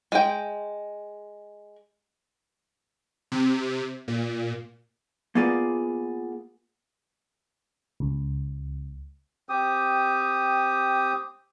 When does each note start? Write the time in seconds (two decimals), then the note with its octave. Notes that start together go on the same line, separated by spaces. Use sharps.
0.12 G#3 G5
3.32 C3
4.08 A#2
5.35 A#3 B3 F4 G#4 D5
8.00 C#2
9.49 C4 G4 D#6